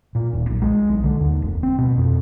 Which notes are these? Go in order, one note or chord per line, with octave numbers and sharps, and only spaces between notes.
A#2
D#1
B1
G#3
B1
D3
D#2
F1
C4
B2
F2